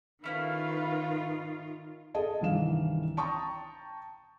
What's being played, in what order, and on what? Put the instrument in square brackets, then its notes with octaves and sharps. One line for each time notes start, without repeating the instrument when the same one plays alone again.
[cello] D#3 F4 [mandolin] A3 C#4 E4 [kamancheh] B4 F5
[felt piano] G#4 A4 D#5 A5
C2 G2 D#3 E3 F5 E7
G5 A5 A#5 C#6 D#6